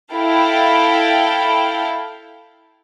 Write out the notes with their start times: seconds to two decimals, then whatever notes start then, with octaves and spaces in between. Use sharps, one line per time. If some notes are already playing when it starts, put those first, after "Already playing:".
0.13 E4 A4 F5 G5